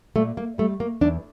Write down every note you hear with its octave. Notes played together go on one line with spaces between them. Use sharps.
A#2 A3
A#3
G3 A3
A#3
E2 D4